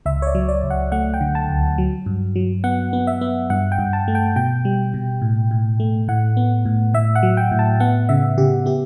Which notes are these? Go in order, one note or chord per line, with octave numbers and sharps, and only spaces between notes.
C#2 E5
C#5
D5
F#3
D5
C#2
F#5
A3 F#5
G5
D3
A5
D2
F#3
G2
F#3
B3 F#5
B3
E5
B3
G2 F#5
G5
G2
A5
A3
G5
B2 G5
G3
B2
A2
A2
A3
A2 F#5
B3
A2
A2 E5
F#5
F#3
G5
A2
A5
B3 F#5
C#3 E5
C#3 G4
B3 G4